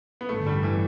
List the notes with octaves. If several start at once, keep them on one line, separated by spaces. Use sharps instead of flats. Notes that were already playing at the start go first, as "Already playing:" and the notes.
B3
A1 G2 D3 A3
G3
E3